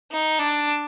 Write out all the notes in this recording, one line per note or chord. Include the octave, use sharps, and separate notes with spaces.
D#4
D4